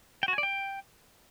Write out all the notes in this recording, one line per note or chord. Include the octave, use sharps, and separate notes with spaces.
G5
F#4
G#5
D5
G5